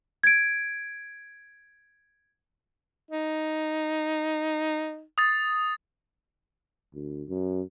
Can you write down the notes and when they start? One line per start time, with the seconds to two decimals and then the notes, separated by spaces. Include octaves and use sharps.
0.23 G#6 D7
3.11 D#4
5.18 D#6 A6
6.94 D2
7.29 F#2